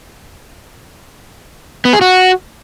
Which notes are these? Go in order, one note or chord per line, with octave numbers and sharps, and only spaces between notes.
B3
G#4
F#4